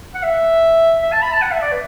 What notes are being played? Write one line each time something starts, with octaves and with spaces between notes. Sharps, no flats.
F#5
E5
E5
A5
B5
A5
F#5
E5
D5
B4